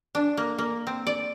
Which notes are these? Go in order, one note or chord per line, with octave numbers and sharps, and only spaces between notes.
D4
A#3
A#3
C4
D5